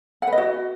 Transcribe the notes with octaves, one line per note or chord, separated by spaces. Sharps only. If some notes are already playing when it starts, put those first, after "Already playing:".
F#5
B4
D#5
F#4